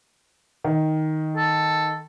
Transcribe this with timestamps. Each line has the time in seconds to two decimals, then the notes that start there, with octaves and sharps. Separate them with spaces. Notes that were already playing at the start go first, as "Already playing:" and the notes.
0.64 D#3
1.37 A4